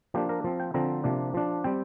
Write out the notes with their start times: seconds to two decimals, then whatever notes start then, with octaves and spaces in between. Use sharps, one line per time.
0.14 F3 A#3 D4 G4
0.29 A#4
0.44 F3 C4
0.60 G5
0.74 D3 F3 C4 A#5
1.04 C3 F3 A#3 D4
1.34 F3 D4
1.64 G3 C4 G5